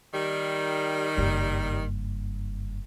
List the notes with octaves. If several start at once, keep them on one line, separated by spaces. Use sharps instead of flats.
D#3 G3
F#1 G2